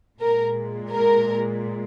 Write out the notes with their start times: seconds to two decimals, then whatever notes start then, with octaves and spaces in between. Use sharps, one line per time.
0.21 A#2 G#3 A#4
0.91 A#4